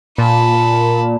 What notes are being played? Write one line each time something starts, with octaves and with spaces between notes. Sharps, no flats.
A#2 A5 B5